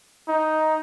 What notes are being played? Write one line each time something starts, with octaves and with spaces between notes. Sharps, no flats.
D#4